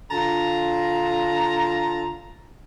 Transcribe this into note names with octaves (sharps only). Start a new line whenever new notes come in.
D3 F4 A5 A#5